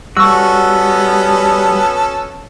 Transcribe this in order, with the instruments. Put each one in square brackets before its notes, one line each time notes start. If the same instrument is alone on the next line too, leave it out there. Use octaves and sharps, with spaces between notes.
[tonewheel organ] G3 [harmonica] B3 C#4 A4 [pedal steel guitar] F#4 [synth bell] C#6 E6